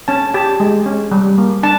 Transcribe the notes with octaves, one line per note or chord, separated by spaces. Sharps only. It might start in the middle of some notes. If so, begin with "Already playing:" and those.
C#4 A5
G4 A5
G#3
C#4
G3
A#3
D4 A5